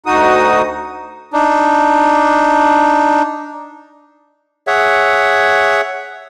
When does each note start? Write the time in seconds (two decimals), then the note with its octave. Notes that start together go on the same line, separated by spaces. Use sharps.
0.06 D2 D#4 F#4 D#6
1.33 D4 D#4
4.67 G#4 C#5 E5 F#5